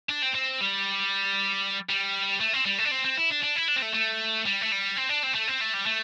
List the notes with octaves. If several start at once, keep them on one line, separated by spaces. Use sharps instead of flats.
D4
C4
C4
G3
G3
A3
C4
G3
A3
D4
C4
C4
E4
D4
D4
E4
D4
C4
A3
A3
G3
A3
G3
C4
D4
C4
A3
C4
A3
G3
A3